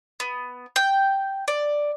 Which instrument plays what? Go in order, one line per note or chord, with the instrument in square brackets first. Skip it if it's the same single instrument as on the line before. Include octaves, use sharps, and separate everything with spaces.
[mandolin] B3
G5
D5